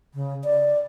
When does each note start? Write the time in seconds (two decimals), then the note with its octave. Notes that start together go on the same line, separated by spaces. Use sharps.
0.14 C#3
0.44 D5